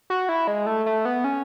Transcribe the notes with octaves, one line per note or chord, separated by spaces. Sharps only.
F#4
E4
G#3
A3
A3
B3
C#4